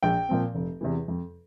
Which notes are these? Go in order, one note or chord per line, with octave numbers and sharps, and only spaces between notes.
A#1 G5
A#2 F3 C4
F1
E2 C3 E3
F2